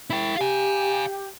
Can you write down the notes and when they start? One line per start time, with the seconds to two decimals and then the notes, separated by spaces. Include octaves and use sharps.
0.10 E4 G5
0.37 G4 F5 G#5